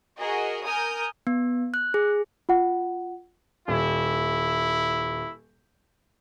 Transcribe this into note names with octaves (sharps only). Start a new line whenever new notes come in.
F#4 G#4 A#4 D#5
A#4 G#5 D#6 F6 G6
B3
F#6
G#4
F4 F#5
D#1 E4